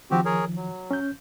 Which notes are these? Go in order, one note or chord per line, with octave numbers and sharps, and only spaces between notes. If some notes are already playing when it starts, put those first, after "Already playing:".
D#3 F3 C4 F#4 G4
G#4 A#4 C#5
F#3
C#4 G6